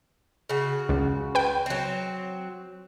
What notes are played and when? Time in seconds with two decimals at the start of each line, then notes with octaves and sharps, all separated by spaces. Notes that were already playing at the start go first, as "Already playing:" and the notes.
0.49 C#3 F#4
0.89 C#2
1.35 B4 G5
1.66 F#3 C4